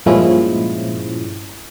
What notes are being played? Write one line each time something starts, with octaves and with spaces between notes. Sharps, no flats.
G2 A#2 F3 G#3 C#4 E4